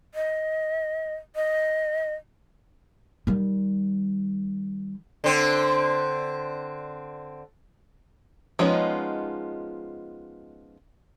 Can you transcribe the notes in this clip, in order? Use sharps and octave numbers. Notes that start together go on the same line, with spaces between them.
D#5
D#5
D#3 G3
D3 C4
F3 G#3 B3 C#4 D#4